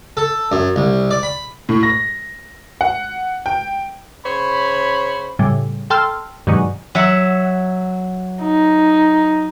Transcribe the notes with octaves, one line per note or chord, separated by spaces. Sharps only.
A4
F#2
C2
D5
B5
A2
A#6
F#5
G5
C#3 C5 C#5 B5
A2 C#3 G3
A4 G5 A5 C6 E6 F6
G2 B2 D#3 F#3 G#3
F#3 E5 F#5
D#4